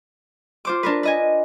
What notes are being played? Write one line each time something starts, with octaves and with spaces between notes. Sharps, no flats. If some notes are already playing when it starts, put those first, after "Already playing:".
F4 C5 D6
D4 A#4 B4
B4 D#5 G#5